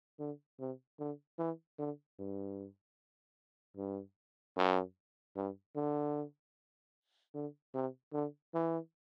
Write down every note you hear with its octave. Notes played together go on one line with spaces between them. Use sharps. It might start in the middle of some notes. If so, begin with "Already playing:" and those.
D3
C3
D3
E3
D3
G2
G2
F#2
G2
D3
D3
C3
D3
E3